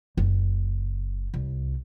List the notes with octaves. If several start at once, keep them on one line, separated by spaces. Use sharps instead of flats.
F#1
C2